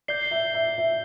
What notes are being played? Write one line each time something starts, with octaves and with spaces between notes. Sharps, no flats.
D5 G6 C7 G7
E5
E5
E5